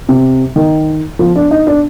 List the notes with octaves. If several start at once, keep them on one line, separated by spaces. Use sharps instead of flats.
C3
D#3
F3
D4
D#4
D4